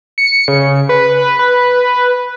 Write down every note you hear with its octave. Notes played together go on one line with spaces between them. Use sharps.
C#7
C#3
B4
B4